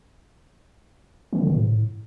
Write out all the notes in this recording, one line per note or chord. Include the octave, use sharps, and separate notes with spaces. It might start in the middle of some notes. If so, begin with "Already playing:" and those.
E3
D3
C#3
A2